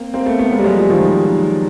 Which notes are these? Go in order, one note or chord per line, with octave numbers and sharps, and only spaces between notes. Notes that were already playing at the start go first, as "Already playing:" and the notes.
Already playing: A#3 C4
A#3 C4
A3 B3
A3 B3
G#3 A#3
G3
F#3 G#3
F3 G3
D#3 F3